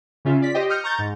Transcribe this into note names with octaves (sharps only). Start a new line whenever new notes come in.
C#3 C#4 F4 E5
F4 D5 B6
G4 C5 D#5 G5
D#6 F6 G6 C#7
A#5 C#6 G6 A6
G#2